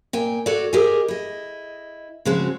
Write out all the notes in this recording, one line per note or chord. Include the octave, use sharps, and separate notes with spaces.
A#2 G5 G#5
F#4 A4 C#5 D5
G4 G#4 A#4 D#5 G#5
E4 D#5
C#3 F3 G#3 C4 F#4